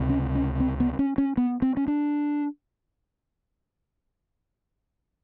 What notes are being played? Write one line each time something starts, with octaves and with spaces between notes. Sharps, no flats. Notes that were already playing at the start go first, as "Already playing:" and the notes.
Already playing: C#2 C3
C#4
C#4
C4
B3
C#4
C#4
B3
C4
C#4
D4